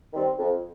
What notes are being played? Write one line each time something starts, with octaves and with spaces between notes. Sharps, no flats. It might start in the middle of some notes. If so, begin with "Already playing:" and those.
D#3 G3 C4
F2